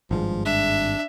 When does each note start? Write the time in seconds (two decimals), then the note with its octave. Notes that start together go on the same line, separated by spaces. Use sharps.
0.11 G#1 G2 F3 G#3
0.46 D4 E5